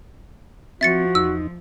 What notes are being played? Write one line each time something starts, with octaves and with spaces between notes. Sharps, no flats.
F3 C4 F#4 E5 A6 C#7
E2 D#4 E6